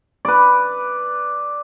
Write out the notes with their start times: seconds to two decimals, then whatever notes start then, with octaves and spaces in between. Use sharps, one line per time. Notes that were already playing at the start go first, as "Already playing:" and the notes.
0.25 B4 D5